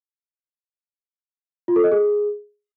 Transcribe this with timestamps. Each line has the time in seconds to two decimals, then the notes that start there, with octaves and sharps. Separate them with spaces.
1.68 F4
1.76 A4
1.84 D#5
1.92 G#4